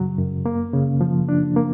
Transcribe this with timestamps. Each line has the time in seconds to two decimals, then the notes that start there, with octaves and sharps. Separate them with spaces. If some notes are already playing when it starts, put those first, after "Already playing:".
Already playing: F#2 C#3 F#3
0.18 F#2
0.46 A#3
0.73 C#3
1.01 F3
1.29 D4
1.56 A#3